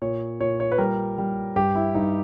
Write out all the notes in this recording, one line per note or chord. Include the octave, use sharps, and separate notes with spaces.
A#2 C#5
A#2 C#5
C#5
B4
G3 A#4
G3
G2 G4
E4
G2 D#4